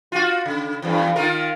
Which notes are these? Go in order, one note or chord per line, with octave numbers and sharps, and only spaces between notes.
F4 F#4
C#3
E2 G2
D#3 F4 A#4